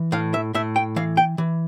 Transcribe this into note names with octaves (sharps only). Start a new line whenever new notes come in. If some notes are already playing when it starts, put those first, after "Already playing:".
Already playing: E3
A2 F5
E5
A2 E5
G5
E3 F5
G5
E3